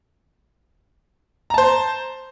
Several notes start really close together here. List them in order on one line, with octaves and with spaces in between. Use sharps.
A#5 A5 C5